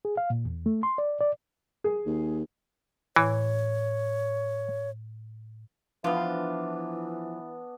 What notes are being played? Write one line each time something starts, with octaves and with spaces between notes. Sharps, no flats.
G#4
F5
A#2
E2
A3
C6
D5
D5
G#4
D#2
A2 E3 C#5
E3 F3 B3 D4 F4